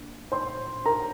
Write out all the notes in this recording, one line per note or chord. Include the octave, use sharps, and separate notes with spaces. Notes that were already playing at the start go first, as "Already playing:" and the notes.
Already playing: A#3 D4
C5 C6
A#4 A#5